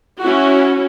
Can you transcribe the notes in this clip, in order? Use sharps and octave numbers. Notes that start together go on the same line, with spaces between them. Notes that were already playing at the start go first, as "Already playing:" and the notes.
C#4 E4 F#4